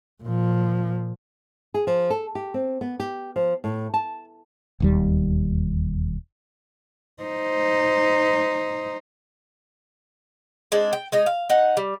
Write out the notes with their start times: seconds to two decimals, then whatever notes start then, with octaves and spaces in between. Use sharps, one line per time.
0.23 A#2 F3
1.74 G#4
1.87 F3
2.10 A4
2.35 G4
2.54 C4
2.81 B3
3.00 G4
3.36 F3
3.64 A2
3.94 A5
4.80 E1 D#2 G3
7.22 D#4 C5
10.72 G#3 C4 D4
10.93 G5
11.12 G#3 D#4 D#5
11.26 F5
11.49 D#4 F#5
11.77 G3